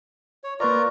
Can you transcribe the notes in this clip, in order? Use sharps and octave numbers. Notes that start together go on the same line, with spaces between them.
C#5
A#3 F4 A#4 B4 D5 A#5 C#6